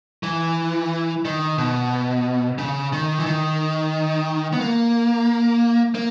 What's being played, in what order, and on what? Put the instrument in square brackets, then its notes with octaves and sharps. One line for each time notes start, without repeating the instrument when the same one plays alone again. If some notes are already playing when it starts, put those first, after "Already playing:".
[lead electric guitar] E3
D#3
B2
C#3
D#3
E3
D#3
B3
A#3
A#3